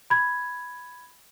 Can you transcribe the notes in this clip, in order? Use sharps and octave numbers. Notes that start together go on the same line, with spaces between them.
B5 G#6